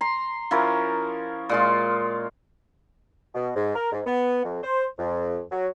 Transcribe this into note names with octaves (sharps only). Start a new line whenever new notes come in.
A#5 C6
F3 C#4 E4 A#4
A#2 G#3 F4
B2
G#2
A#4
G#2
B3
F2
C5
F2
F#3